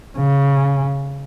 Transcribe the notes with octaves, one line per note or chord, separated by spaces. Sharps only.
C#3